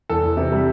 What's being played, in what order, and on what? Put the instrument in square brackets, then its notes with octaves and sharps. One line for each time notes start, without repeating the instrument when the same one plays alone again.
[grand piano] E2 A4
E2
C3
G3